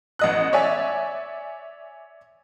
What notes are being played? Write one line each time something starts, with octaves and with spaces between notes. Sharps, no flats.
A1 D#5 F#6
C#5 D5 E5 G#5